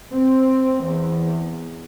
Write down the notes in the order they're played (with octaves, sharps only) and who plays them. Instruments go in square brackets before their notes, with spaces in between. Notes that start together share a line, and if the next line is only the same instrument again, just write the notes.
[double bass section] C4
E2